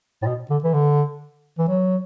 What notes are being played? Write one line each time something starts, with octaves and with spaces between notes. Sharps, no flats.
A2
B2
D3
E3
D3
E3
F#3